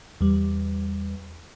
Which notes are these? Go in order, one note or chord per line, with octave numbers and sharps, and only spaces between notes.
E2 G3